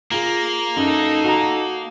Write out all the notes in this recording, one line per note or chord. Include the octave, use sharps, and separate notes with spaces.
A#3 F4 G#4
F#2 D#4 A4
F#4 A#5